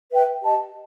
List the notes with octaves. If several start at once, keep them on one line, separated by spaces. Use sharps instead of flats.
B4 E5 G5
G4 D#5 A5